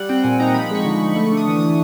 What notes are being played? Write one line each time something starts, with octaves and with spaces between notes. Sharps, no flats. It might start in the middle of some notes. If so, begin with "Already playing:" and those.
Already playing: G3 F#5
C4 G5
A#2 G#5
D#4 A#5
F3 B5
G#3 C#6
D3
D3 C#6
A3 C#6
D4
D#6
E3
D#6
E3